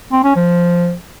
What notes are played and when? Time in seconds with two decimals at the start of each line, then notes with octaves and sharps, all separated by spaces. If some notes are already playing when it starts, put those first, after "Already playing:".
0.12 C4
0.24 C#4
0.36 F3